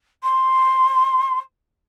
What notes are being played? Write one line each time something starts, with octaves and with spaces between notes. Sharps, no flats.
C6